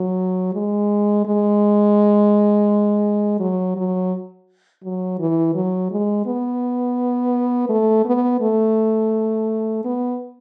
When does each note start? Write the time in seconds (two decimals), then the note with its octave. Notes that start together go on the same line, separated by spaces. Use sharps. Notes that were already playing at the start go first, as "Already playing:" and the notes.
Already playing: F#3
0.54 G#3
1.25 G#3
3.40 F#3
3.76 F#3
4.84 F#3
5.19 E3
5.55 F#3
5.91 G#3
6.26 B3
7.69 A3
8.05 B3
8.41 A3
9.85 B3